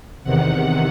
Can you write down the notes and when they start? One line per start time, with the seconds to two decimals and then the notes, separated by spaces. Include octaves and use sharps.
0.24 E2 C3 D#3 F#5